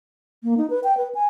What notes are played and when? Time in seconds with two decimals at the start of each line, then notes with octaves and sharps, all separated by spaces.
0.44 A#3
0.57 D#4
0.70 B4
0.84 G5
0.97 B4
1.15 G#5